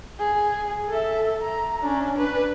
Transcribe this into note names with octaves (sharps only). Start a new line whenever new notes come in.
G#4
A4 E5
A#5
C#4 D4
D4 B4